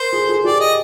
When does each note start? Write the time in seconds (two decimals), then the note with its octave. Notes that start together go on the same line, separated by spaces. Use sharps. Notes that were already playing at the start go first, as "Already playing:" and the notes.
Already playing: A#4 C5
0.13 G#4
0.21 A4
0.29 G#4
0.44 G4 D5
0.60 D#5